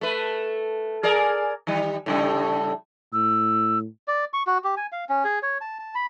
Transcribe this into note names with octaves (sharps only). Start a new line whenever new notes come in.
A3 B4
G#4 A#4 D5
D#3 G3
A2 C#3 G3
A2 E6
D5
C#6
F#4
G4
G#5
F5
C#4
G#4
C#5
A5
A5
B5